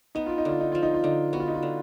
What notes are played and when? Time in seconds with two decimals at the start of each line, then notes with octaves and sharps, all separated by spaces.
0.15 B3 D#4
0.26 F4
0.38 D#4
0.45 D3 F4
0.61 D#4
0.72 F3 F4
0.83 D#4
0.94 F4
1.04 D3 D#4
1.33 B3 F#4
1.40 F4
1.48 D#4
1.54 F4
1.63 D3